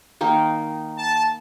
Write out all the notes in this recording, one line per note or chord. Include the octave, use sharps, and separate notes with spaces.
D#3 A#3 D#4
A5